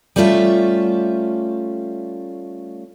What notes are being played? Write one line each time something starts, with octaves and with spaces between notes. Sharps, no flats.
G3 A3 C#4 F4 E5